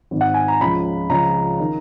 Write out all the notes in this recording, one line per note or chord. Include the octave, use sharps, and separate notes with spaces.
G#1 G#2 D#3
F#5
G#5
A#5
C#2 C#3 F3 B5
C#2 C#3 F3 A#5
D#3